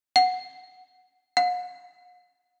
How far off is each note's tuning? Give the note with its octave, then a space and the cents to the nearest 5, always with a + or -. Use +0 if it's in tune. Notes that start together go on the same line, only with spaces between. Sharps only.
F#5 -10
F#5 -45